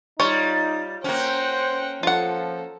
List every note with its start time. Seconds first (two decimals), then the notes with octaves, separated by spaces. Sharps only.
0.20 G3 D#4 F4 C#5
1.04 A#3 C#4 C5 F#5 G5
2.03 F3 F4 A4 F#5